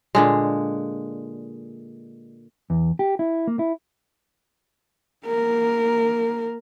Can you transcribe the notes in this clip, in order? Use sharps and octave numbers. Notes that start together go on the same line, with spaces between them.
A#2 D3 G#3
E2
G4
E4
A#3
E4
A#3 A#4